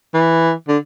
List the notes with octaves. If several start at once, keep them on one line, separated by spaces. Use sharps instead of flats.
E3
D3